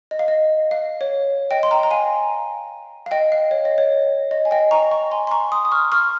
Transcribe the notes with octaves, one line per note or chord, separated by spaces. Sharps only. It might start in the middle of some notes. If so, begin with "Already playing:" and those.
D#5
F5
D#5
F5
C#5
D#5 G5
C6
G5 A#5
A#5
F5 G#5
F5
D#5 G5
F5
C#5
D#5
C#5
D#5
G#5
D#5 G5
A#5 C#6
A#5 C#6
G#5 C6
C6
A#5 C#6
C6 D#6
D#6
C#6 F6
C#6 F6